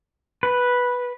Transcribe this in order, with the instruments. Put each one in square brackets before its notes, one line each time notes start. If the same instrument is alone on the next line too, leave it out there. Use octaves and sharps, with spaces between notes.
[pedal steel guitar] B4